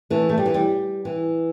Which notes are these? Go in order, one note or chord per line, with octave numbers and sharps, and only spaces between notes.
E3 A3
A3
G3
E3
G3
E3